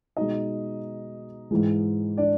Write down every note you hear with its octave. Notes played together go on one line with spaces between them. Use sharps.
B2 G#3 D#4 D#5
G#2 E3 G#3
D4 D5